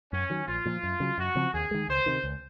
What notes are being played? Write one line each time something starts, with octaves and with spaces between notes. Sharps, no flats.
F#2 C#4
D#3 F#3
A#1 F4
A#2 F3
F#2
C#3 F#3
F#2 F#4
C#3 F3 C4
D#2 G#4
D#3 G#3
C#2 C5
C3 D#3
C#2